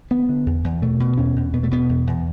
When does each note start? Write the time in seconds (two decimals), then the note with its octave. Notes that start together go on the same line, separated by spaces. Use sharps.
0.11 D3 B3
0.29 D3
0.46 E2
0.64 E2
0.82 B2 A3
1.00 B2
1.18 E2 C#4
1.36 E2
1.53 B2 B3
1.63 A3
1.71 B2 B3
1.89 E2
2.07 E2